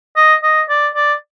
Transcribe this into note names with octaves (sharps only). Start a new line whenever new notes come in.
D#5
D#5
D5
D5